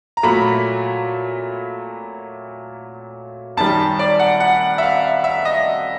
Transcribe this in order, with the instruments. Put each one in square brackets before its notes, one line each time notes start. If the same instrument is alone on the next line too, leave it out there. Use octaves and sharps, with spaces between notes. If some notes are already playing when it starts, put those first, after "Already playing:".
[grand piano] A#5
A#2 F#3 A3 B5
F#2 D#3 G3 A5
D5
F#5
F#5
E5
F5
E5
D#5